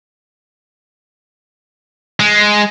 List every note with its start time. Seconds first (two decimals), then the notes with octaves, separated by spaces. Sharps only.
2.20 G#3